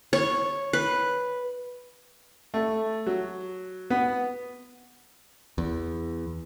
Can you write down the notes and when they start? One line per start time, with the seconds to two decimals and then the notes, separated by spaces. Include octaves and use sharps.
0.13 C#5
0.73 B4
2.54 A3
3.06 F#3
3.90 B3
5.58 E2